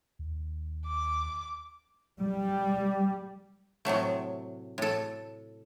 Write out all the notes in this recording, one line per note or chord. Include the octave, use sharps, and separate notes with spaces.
D#2
D6
G3
A2 C3 F#3 A3
A2 A4